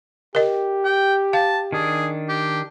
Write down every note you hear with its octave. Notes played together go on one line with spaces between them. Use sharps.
G4 A#4 D#5
G5
F5 A5
D#3 D4 G#4
G4